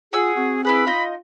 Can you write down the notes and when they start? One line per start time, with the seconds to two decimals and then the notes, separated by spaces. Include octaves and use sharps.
0.13 F4 G#4 F#5 G#5 E6
0.37 C4 F#4
0.65 E4 G#4 B4 F#5 B5
0.87 D#4 F4 D#5